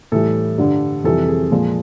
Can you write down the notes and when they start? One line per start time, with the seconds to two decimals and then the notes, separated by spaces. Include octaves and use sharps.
0.12 A2 E3 G3 A4
0.58 G2 D3 G3
1.04 F2 C3 E3 G3 A4
1.28 G#4
1.51 A#2 F3 G#3